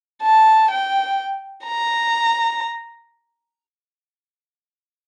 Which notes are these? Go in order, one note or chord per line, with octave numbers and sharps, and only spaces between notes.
A5
G5
A#5